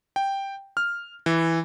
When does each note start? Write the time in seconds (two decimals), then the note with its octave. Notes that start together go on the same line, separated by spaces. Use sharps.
0.16 G5
0.77 F6
1.26 E3